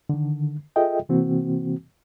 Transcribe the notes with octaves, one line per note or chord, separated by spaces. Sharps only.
D3 D#3
F4 G#4 A4 D#5 E5 G5
C3 E3 A#3 C4 F#4